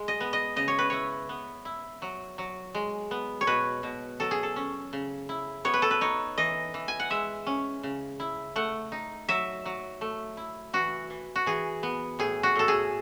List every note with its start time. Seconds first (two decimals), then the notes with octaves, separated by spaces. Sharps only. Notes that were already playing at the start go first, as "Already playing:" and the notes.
Already playing: G#3
0.08 D#5
0.20 B3
0.33 D#5
0.56 C#3 D#5
0.68 C#5
0.79 B4
0.90 E4 C#5
1.29 B3
1.65 E4
2.02 F#3
2.38 F#3
2.75 G#3
3.11 B3
3.41 C#5
3.47 B2 B4
3.83 B2
4.20 F#3 A4
4.31 G#4
4.43 A4
4.56 C#4
4.93 C#3
5.29 E4
5.65 B3 C#5
5.74 B4
5.82 A4
5.91 B4
6.01 D#4 C#5
6.38 E3 D#5
6.74 E3
6.88 G#5
7.00 F#5
7.10 G#3 E5
7.46 C#4
7.83 C#3
8.20 E4
8.56 A3 F#5
8.92 D#4
9.29 F#3 E5
9.66 F#3
10.01 A3
10.37 E4
10.73 E3 F#4
11.10 E3
11.36 F#4
11.46 E3 G#4
11.83 B3
12.19 A2 G#4
12.43 F#4
12.56 A2 A4
12.68 G#4